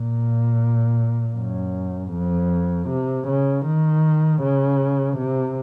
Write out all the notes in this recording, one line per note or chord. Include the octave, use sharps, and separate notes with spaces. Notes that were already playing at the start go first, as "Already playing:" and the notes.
Already playing: A#2
F#2
F2
C3
C#3
D#3
C#3
C3